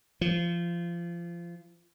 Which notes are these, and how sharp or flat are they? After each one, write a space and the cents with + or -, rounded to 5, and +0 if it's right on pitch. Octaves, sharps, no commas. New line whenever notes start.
F3 -25